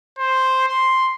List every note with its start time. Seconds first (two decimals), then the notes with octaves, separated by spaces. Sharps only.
0.19 C5
0.68 C6